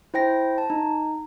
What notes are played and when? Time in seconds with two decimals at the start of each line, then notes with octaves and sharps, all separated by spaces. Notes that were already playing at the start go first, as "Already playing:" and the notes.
0.14 E4 C5 G5 A#6
0.58 A5
0.70 D#4